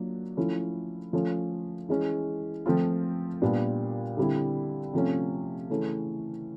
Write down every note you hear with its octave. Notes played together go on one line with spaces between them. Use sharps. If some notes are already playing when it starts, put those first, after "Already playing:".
Already playing: F#3 A#3 D4 F4
F3 A3 C#4 E4
F3 A3 C#4 F4
E3 G#3 C#4
F3 A3 C4 F4
A#2 G3 B3 D4 F4
D3 G3 C4 E4
C3 F3 A3 C#4
C#3 E3 A3 C#4